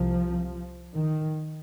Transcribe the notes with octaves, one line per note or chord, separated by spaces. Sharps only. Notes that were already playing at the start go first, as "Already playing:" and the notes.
Already playing: C2 C3 F3
D#3